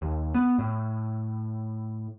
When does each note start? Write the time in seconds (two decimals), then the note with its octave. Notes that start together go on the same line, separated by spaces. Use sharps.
0.02 D#2
0.34 B3
0.58 A2